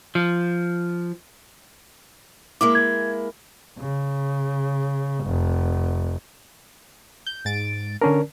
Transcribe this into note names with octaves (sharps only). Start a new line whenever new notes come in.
F3
G#3 A#3 E4 D6
G#6
C#3
F1
G6
G#2 A6 D7
D3 C#4 D4 A#4